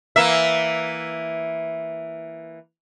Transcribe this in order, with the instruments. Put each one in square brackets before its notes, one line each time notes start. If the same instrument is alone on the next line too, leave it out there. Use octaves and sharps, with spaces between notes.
[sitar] E3 A#3 E5